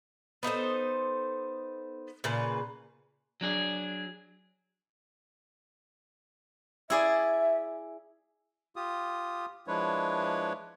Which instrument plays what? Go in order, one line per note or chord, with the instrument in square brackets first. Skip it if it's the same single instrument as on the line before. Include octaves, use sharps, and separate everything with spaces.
[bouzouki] B3 D#4 A4 C5
A#2 C#3 B4
[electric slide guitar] F#3 D4 G#4
[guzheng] E4 G#4 D5 [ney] E5
[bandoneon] F4 G4 D#6
F3 G#3 D4 E4 B4 C#5